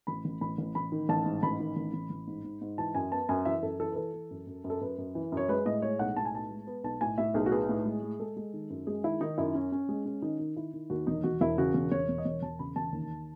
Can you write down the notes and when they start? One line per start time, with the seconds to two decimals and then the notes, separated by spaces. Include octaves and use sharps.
0.07 A1 B5
0.25 A1
0.41 A1 B5
0.58 A1
0.75 A1 B5
0.92 D#3
1.09 A1 A5
1.25 G#2
1.43 A1 B5
1.60 D#3
1.76 A1
1.93 A1
2.10 A1
2.27 G#2
2.44 G#2
2.61 G#2
2.78 E3 A5
2.95 F#2 G#5
3.12 B3 A5
3.29 F#2 G#5
3.45 E3 E5
3.62 F#2 A4
3.79 E3 A4
3.92 B4
3.96 E3 A4
4.14 E3
4.31 F#2
4.47 F#2
4.64 F#2
4.70 A4
4.81 F#2 B4
4.98 F#2
5.15 E3
5.32 F#2
5.37 C#5
5.49 G#3 B4
5.66 A2 D#5
5.82 G#3 C#5
5.99 B1 F#5
6.16 A2 A5
6.25 G#5
6.33 B3 A5
6.51 G#3
6.67 B3
6.84 B1 A5
7.01 A2 G#5
7.18 A2 E5
7.34 B1 G#4
7.46 F#4
7.51 B3 G#4
7.69 A2
7.86 G#3
8.03 G#3
8.20 G#3 A4
8.37 G#3
8.53 D#3
8.70 F#2
8.87 G#3 G#4
9.04 D#3 E4
9.21 D#3 D#4
9.38 F#2 E4
9.55 C#4
9.72 C#4
9.89 G#3
10.06 C#4
10.22 D#3 D#4
10.39 D#3
10.56 D#3 E4
10.73 D#3
10.90 D#2 F#4
11.07 E1 D#4
11.24 E1 F#4
11.41 E1 E4
11.58 C#3 F#4
11.74 E1
11.91 E1 C#5
12.09 E1
12.18 D#5
12.25 E1 C#5
12.42 E1 A5
12.59 C#3 B5
12.76 E1 A5
12.93 D#2